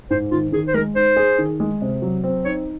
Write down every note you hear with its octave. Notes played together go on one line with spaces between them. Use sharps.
G#2 C5
D#3 F4
D#3 G#4
C5
G#3 A#4
D#4 C5
G#4
D#3
G#3
C3
F#3
C4
D#4 C#5